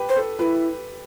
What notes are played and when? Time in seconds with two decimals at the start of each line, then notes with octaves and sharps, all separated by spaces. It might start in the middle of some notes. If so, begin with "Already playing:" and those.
Already playing: G4 B4
0.09 C5
0.16 A4
0.39 E4 F4 B4